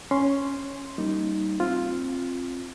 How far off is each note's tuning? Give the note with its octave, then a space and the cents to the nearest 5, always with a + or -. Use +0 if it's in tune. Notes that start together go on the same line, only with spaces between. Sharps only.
C#4 +0 C6 +0
G3 -15 A#3 -20 D#4 +0
C4 +20 F4 +0